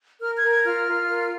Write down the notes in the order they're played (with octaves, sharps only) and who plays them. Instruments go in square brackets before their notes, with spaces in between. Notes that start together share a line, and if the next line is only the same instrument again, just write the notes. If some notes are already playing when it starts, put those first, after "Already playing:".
[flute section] A#4 F6
G#6
A#4
G#6
F4 F6
F4
A#4